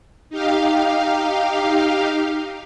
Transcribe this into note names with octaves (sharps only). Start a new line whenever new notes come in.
D#4 G4 F5